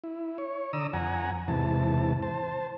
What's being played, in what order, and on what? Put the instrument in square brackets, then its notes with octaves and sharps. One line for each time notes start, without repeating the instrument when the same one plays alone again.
[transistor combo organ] E4
C#5
D3 D5 A#5 D#6 E6
F2 F#5 G#5 A#5
E2 G#2 C3 E3 A5
C5 A5